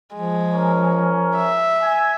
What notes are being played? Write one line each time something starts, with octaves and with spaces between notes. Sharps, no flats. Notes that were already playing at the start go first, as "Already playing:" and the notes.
F3 G#3
C#4 A#4
E5
G#5